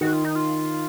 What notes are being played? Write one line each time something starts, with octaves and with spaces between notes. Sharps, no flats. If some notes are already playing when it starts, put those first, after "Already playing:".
D#3 F#4
F4
D#4
F4